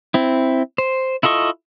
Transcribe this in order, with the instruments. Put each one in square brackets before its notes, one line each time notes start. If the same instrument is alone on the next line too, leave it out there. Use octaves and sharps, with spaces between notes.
[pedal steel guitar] C4 E4
C5
E4 F4 A4 D#5 C#6